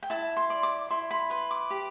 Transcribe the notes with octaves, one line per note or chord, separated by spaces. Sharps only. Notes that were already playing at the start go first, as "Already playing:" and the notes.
G5
E4 A5
C6
D5
D6
E4 C6
B5
B4 C6
D6
G4